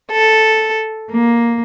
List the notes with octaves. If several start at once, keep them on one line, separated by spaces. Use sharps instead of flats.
A4
A#3